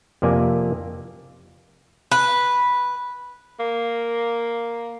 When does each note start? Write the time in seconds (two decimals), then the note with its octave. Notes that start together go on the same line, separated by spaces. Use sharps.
0.22 F2 C3 A#3 D5 G#5
2.11 B4
3.59 A#3